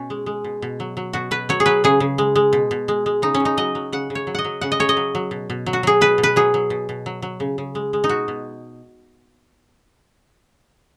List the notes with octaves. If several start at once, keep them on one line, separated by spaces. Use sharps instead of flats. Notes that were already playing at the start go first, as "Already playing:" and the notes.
Already playing: B2 C#4
G#3
G#3
B2
B2
F#3
F#3
B2 F#4
B2 B4
F#3 C#5
G#4
F#3 B4
C#3 G#4
C#3
G#3
G#3
B2
B2
G#3
G#3
C#3 D#4
C#4
C#3
D#4
F#3 D#5
F#3
C#3 F#5
C#3
C#5
F#3
D#5 F#5
F#3
C#3 F#5
D#5
C#3 C#5
D#5
F#3
F#3
B2
B2
F#3
F#4
F#3 G#4
B2 B4
B2
B4
F#3 G#4
F#3
B2
B2
F#3
F#3
C#3
C#3
G#3
G#3
D#4
B2 F#4
B2